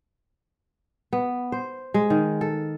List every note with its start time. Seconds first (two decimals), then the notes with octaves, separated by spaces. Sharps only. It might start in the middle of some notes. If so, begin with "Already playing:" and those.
1.13 B3
1.52 C5
1.94 G#3
2.10 D#3
2.41 A4